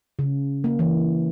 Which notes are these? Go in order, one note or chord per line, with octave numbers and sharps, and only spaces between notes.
C#3
A#3
E3